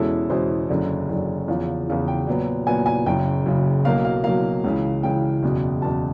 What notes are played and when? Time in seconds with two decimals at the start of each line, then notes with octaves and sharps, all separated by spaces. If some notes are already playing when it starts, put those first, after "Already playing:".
Already playing: E2 B2 G#3 C#4 E4 A4
0.30 E2 B2 G#3 C#4 E4 C5
0.69 F#1 F#2 D3
1.09 F#1 F#2 D3
1.48 E2 C#3 F3
1.88 E2 C#3 F3
2.08 G5
2.27 A#2 F#3 B3
2.67 A#2 F#3 B3 G#5
2.86 G#5
3.06 F#1 F#2 C#3 G5
3.46 F#1 F#2 C#3
3.85 B1 B2 F#3 A#3 F5
4.05 F5
4.24 B1 B2 F#3 A#3 F5
4.64 C#2 C#3 E3
5.03 C#2 C#3 E3 G5
5.43 F#1 E2 B2
5.82 F#1 E2 B2 A5